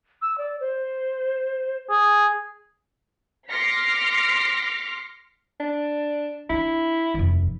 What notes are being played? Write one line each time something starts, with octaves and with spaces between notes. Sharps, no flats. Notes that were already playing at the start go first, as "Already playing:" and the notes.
E6
D5
C5
G#4
C6 D6 F6 A#6 B6 C#7
D4
D4 E4
F1 D#2